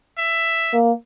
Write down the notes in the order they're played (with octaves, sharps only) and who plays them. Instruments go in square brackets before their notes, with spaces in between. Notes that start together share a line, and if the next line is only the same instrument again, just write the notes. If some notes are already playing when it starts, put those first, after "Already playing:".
[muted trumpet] E5
[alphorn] A#3